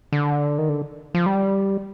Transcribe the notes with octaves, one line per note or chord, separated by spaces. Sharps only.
D3
D#3
D3
F3
G3